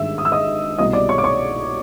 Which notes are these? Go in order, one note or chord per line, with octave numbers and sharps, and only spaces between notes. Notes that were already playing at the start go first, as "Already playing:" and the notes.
Already playing: G#1 G2 D#3 G#3 E5 E6
D#6
E6
D#5 D#6
C2 B2 G3 D#5 D#6
D5 D6
C#5 C#6
D6
C#5 C#6